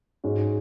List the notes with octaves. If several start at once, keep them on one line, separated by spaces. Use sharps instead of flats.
G#2 G#3 C#4 F#4